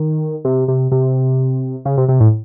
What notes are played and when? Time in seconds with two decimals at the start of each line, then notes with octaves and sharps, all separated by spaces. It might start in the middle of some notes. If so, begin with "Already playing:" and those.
Already playing: D#3
0.45 C3
0.68 C3
0.92 C3
1.85 C#3
1.97 C3
2.08 C3
2.20 A2